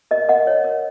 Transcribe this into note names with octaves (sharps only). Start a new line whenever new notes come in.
A#4 D#5
A#4 D#5 F#5
C#5
A#4